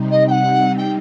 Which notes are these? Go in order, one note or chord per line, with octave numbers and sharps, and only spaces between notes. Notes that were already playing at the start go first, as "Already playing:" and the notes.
Already playing: C3 G3 C4 D#4
D#5
G5
F#5
G5